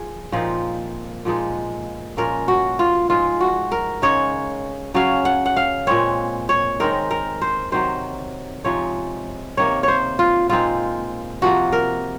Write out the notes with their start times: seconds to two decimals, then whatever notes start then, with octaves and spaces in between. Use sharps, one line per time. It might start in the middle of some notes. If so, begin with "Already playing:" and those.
Already playing: F3 G#4
0.32 A#2 F3 C4 D#4
1.25 A#2 F3 G#3 D#4
2.17 A#2 F3 G#3 C#4 A#4
2.48 F#4
2.79 F4
3.10 G#2 F3 G#3 F4
3.40 F#4
3.72 A#4
4.02 C#3 G#3 D#4 C#5
4.94 C#3 F#3 C#4 F5
5.25 F#5
5.46 F#5
5.57 F5
5.87 A#2 G#3 C4 C#5
6.49 C#5
6.80 D#3 G#3 C4 D#4 A#4
7.11 A#4
7.42 C5
7.72 C3 D#3 F#3 C5
8.64 C3 F3 G#3 D#4 C#5
9.57 C3 D#3 A#3 C#5
9.83 C5 C#5
10.19 F4
10.49 A#2 G#3 C4 D#4 F4
11.42 C3 F3 A#3 F#4
11.72 A#4